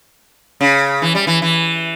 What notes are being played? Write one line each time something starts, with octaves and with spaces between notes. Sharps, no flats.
C#3
E3
G3
E3
E3